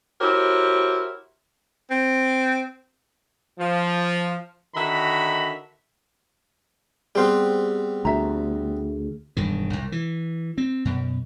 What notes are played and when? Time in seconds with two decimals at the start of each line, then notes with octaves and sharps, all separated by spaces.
0.20 E4 F#4 G4 A#4 C5 C#5
1.91 C4
3.59 F3
4.75 D3 D#3 F#4 E5 A#5 B5
7.15 G3 B3 C4 G4 G#4 C5 F6
8.05 D2 E5 A#5
9.37 E1 G2 D#3
9.73 C2
9.92 E3
10.58 C4
10.85 F#2 B2